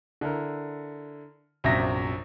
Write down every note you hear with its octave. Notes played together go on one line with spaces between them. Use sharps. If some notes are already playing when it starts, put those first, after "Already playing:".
D3 E4 A#4
A#1 F#2 C3 E5 A#6